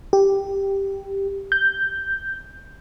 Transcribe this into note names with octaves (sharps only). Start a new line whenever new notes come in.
G4
G6